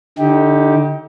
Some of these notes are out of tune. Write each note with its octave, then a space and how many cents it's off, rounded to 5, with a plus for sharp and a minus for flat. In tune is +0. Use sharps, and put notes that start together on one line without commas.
D3 +0 D#4 +30 G4 +0